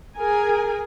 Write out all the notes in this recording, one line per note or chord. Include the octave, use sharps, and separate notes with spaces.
G#4 A#4 G#5